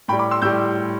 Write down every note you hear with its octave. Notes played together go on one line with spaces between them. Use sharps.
A2 G3 G5 B5
B5 D6
C6 E6
A2 G3 E6 G6